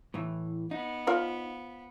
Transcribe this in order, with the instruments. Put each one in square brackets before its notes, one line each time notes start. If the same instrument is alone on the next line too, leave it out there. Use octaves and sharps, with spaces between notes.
[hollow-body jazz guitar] A2 E3
[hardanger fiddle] B3 [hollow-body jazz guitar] D#4
[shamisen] F3 F4 D5